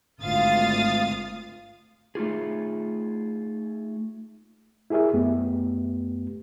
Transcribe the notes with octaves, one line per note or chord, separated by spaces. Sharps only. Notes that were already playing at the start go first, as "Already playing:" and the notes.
G#1 D2 F4 F5 D#6 A6
A3 D#4 F4 G#4
E4 G4 G#4 A#4 E5
F#2 A3 B3 G4